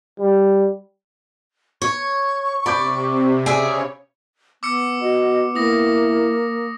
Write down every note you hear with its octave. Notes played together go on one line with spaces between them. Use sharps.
G3
C#5 C#6
C3 D5 B5 D6 G6
C#3 G#4 C#5 D5 E5
B3 D6 E6 C#7
F#4 D#5
A#3 E4 D#6 A#6